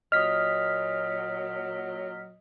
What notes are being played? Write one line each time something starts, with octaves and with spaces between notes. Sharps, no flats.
A#2 F#3 D#5 D#6 F6 B6